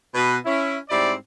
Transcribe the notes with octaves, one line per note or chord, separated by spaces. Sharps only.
B2 B4
C#4 E4
G#2 G3 C4 E4 D5